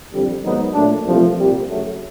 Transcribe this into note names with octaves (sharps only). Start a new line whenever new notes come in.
F2 D3 G3
G#2 D#3 F#3 B3 D#4
A#2 F#3 A3 D4
C2 A#2 F3 A3
C2 A#2 G3
F#2 C#3 F#3 A3